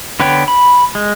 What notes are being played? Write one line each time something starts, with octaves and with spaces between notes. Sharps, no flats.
D3 B3 B4 C#5 G5
B5
G#3